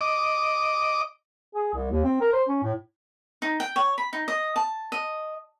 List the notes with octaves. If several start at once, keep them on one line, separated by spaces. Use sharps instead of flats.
D#5 D6
G#4
C2
D#2
C4
A#4
C5
C#4
A2
D#4
G5
C#5
B5
D#4
D#5
A5
D#5